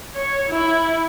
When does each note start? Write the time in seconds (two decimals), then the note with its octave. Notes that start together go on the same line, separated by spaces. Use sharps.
0.15 C#5
0.49 E4